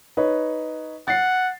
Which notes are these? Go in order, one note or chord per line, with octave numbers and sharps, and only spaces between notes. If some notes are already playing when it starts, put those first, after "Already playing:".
D#4 B4 C#5
F#5 A6 C7